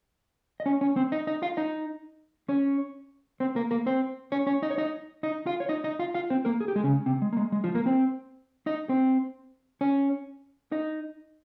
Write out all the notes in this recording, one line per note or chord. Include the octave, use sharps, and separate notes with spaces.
D#5
C#4 C#5
C#4 C#5
C4 C5
D#4 D#5
D#4 D#5
F4 F5
D#4 D#5
C#4 C#5
C4 C5
A#3 A#4
A#3 A#4
C4 C5
C#4 C#5
C#4 C#5
D#4 D#5
C#5
D#4 D#5
D#4 D#5
F4 F5
C#5
D#4 D#5
D#4 D#5
F4 F5
F4 F5
C4 C5
A#3 A#4
G#4
G4
G#3 G#4
C#3 C#4
C3 C4
G#3
A#3
G#3
G#3
F3 F4
A#3 A#4
C4 C5
D#4 D#5
C4 C5
C#4 C#5
D#4 D#5